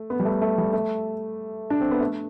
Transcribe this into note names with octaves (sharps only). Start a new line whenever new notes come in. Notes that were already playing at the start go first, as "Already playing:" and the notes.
Already playing: A3
B3
G3
A3
A3
G3
A3
D4
C4
B3
A3